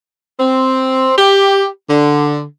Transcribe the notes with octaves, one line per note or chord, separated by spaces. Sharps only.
C4
G4
D3